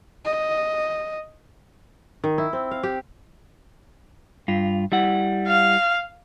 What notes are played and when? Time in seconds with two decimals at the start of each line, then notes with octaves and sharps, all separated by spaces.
0.25 D#5
2.24 D#3
2.38 E4
2.53 C4
2.71 F5
2.83 G4
4.48 G2 F4
4.92 G3 E4 F#5
5.48 F5